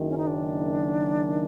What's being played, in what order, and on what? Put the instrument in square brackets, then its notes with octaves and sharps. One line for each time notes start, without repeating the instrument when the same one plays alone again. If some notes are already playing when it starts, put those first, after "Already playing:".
Already playing: [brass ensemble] F#1 F#2 D#3
[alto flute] C#4
D#4
D4